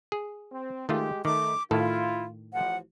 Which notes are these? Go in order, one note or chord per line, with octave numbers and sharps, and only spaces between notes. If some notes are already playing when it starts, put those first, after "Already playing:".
G#4
C4
D#3 G#3 A3 F4 G4
D#3 A3 D#4 D6
A2 D#3 E4 F4 A4
A1 F3 F#5